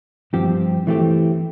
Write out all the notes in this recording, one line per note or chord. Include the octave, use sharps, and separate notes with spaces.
G2 F3 C4 G4
E3 A3 C4 G4